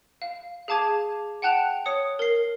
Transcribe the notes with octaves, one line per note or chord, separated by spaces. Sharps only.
F5
G#4 F5 A5 D6 G#6 D#7
F#5 G5 A5 F#6 E7 F7
C#5 D#6 C#7
A#4 C7